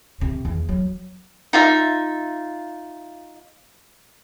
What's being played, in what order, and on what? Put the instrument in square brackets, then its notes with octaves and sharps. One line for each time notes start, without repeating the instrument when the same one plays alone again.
[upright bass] C3
E2
F#3
[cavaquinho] D#4 F4 E5